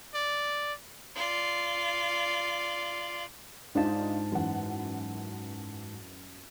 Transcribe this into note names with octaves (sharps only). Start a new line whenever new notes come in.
D5
F4 D5
G#2 D4 D#4 F4 A5
F#2 E3 F#5